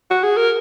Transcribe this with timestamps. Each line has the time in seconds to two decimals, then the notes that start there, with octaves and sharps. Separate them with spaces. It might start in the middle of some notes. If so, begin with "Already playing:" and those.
0.11 F#4
0.23 G#4
0.37 A#4